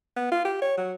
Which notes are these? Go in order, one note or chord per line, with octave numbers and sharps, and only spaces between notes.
B3
F4
G4
C#5
F#3